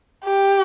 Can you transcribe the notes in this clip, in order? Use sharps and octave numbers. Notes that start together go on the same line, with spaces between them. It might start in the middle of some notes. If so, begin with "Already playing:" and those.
G4